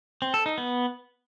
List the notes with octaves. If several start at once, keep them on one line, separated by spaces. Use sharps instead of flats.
C4
A4
D#4
B3